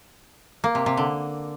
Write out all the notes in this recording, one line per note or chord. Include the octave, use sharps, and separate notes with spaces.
A#3
C3
C3
D3